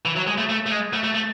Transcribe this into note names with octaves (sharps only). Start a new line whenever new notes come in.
E3
F#3
G#3
A3
A3
A3
G#3
A3
A3
A3